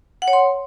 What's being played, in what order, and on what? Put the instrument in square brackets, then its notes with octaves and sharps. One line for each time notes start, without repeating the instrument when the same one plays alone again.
[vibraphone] F#5
C#5
C6